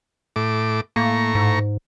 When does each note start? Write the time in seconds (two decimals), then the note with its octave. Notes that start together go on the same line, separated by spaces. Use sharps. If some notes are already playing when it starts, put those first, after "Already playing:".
0.36 A2 D6
0.96 A2 A#3 A#5 C#6
1.35 G#2